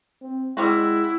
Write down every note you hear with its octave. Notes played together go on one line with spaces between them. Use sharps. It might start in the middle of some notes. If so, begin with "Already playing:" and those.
C4
G3 G#3 C4 E4 F#4